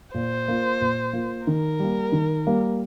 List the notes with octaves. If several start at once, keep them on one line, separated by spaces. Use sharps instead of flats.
A#2 C5
A#3 F4
A#2
A#3 F4
D#3 A#4
G3 A#3
D#3
G3 A#3